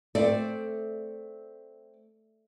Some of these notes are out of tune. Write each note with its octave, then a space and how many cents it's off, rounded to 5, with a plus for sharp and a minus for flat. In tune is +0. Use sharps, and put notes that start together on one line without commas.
A3 +0 C4 +0 D5 +0